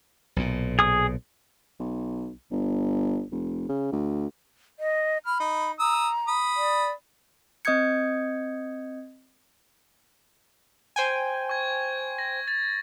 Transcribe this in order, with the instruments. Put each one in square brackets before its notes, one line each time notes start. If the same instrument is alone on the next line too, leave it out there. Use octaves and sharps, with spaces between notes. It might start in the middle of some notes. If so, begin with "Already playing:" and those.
[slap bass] B1 A#2
[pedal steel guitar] G#4 D#6
[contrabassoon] B1
G1
F1
C#3
D2
[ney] D#5
[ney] B5 [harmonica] F6
[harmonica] D#4
[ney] A#5 [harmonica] D#6 E6
[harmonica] B5 D#6
[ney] D5
[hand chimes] C4 D#5 D#6 G6 G#6 C#7
[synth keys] C5 G5 G#5
[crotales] C#6 G#6
A#6
A6